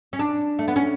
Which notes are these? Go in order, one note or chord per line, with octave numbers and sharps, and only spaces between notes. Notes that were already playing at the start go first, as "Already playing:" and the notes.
C#4
D4
A3
B3
C#4